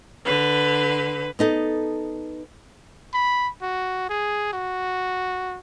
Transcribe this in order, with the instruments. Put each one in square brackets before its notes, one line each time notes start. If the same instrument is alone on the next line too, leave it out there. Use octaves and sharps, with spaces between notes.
[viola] D3 B4
[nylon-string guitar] B3 D#4 A4
[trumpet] B5
F#4
G#4
F#4